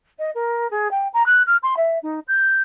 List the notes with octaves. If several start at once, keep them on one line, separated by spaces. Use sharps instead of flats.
D#5
A#4
G#4
G5
A#5
F#6
F6
C6
E5
D#4
G6